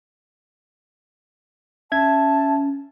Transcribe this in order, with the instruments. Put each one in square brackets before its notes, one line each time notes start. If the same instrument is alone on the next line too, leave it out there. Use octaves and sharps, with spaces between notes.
[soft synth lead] C#4 [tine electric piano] E5 G#6 [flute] A5